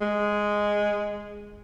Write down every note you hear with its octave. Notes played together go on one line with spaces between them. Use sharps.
G#3